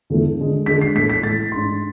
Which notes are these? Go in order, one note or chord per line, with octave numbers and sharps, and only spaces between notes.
E2 D3 A3
D3 G#3 D4
D3 G#3 D4 B6
C7
A2 E3 A3 B6
B6
A2 E3 A3 A6
G#2 G#3 D4 C6